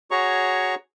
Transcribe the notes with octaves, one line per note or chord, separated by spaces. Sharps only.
F#4 G#4 C#5 A#5 C#6